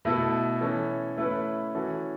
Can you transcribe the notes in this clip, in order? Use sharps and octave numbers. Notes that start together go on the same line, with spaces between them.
B2 A3 E4 A4
E3 C#4 A4
A3 C#4 E4 B4
E3 C#4 F#4 A4